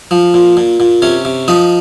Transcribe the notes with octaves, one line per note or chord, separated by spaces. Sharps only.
F3
A#2
A#2
A#2
C3 C#4 C#5
C3
F3 D#4 D#5